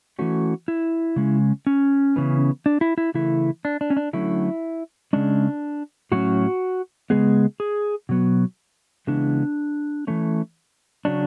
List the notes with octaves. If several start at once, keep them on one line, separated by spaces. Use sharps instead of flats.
E3 A3 C#4 F#4
E4
C#3 G#3 C#4
C#4
C#3 E3 B3
D4
E4
E4
C#3 E3 A3 E4
D4
D4
C#4
D4
D3 F#3 A3 C#4 E4
C#3 G#3 C#4 D4
A2 F#3 C#4 F#4
C#3 G#3 B3 G#4
G#4
B2 F#3 B3
C#3 E3 G#3 B3 D4
E3 A3 C#4
C#3 F#3 C#4 D4